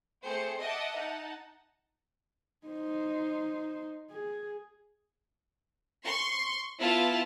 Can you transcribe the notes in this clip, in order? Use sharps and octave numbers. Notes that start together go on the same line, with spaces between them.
A3 C4 G4 G#4 C5 C#7
D#5 E5 F#5 A5 D6 D#6
D#4 F#5 A5
D#4 C5
G#4
C6 C#6
B3 E4 F4 A5